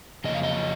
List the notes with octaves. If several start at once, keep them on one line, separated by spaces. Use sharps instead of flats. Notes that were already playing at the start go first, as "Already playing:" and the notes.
F2 C#3 F#3 A#3 D#5
F5
D#5